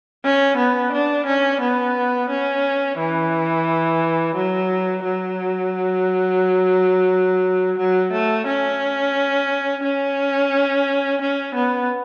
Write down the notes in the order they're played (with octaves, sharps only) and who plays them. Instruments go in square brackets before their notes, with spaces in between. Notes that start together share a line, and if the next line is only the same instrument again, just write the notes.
[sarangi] C#4
B3
D4
C#4
B3
C#4
E3
F#3
F#3
F#3
A3
C#4
C#4
C#4
B3